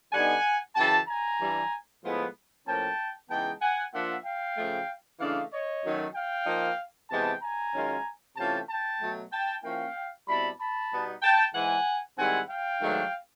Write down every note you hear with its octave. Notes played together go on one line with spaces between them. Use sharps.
D3 G3 B3 D#4 F#5 G#5
F#2 C#3 E3 G5 A5
G#5 A#5
G2 E3 G3
A2 F3 G#3 B3 E4
A2 F3 A#3 C#4 G5 A5
C#3 E3 G#3 B3 D#4 G5 A5
F#5 G#5
F3 A#3 D4 F4 E5 F#5
F5 G5
C#3 F3 A3
C#3 E3 A3 D4 D#5 F5
C#5 D#5
F#2 D#3 F#3 A3
F5 G5
F3 A#3 D#4
C3 E3 G#3 B3 G5 A5
G#5 A#5
F#2 D#3 G#3 C#4 F4
C3 E3 A3 C#4 F4 G5 A5
G5 A5
B2 F#3 A3
G5 A5
F3 A#3 C#4 E4 F5 G5
B2 G3 C4 E4 A5 B5
A5 B5
B2 G3 B3 D#4
G5 A5
G#2 E3 G#3 F#5 G#5
G#2 D#3 G3 C4 E4 F#5 G#5
F5 G5
G#2 D#3 F#3 A3 D4